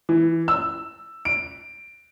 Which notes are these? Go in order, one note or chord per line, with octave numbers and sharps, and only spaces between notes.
E3
E6
D7